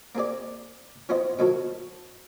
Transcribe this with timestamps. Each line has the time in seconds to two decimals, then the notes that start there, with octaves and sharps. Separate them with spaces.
0.15 A#3 C4 G#4 D5
1.09 E3 F3 B3 C4 C5 D#5
1.39 B2 D#3 F3 F#3 F#4 A4